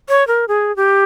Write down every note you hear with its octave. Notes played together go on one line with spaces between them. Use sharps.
C#5
A#4
G#4
G4